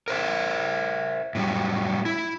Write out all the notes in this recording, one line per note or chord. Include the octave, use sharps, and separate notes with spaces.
A#4 C5 E5
A2 F#3 G3
E4